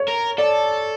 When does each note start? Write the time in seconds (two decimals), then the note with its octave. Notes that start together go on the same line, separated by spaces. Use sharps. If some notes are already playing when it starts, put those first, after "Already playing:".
Already playing: C#5
0.08 A#4
0.38 A4 D5